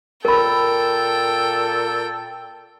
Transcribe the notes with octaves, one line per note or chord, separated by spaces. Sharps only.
A#2 A4 A#4 G5 B5